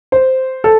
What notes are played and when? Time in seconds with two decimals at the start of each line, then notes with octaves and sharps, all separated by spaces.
0.12 C5
0.64 A4